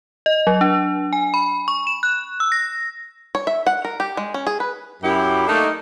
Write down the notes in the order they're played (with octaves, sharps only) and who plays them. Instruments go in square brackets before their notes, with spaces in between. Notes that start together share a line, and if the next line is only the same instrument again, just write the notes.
[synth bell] D#5
F#3
D4
G#5
B5
C#6
E7
F#6
E6
A#6
[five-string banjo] C#5
E5
F#5
A#4
G4
G#3
C#4
G#4
B4
[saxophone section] F#2 [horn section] E4 G4
[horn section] A3 A#3 [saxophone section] D4 D#4